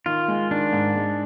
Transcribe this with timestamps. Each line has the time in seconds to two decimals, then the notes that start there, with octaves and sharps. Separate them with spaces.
0.06 D#3 F4
0.28 G#3
0.51 D#3 D4
0.73 G#2
0.96 G#3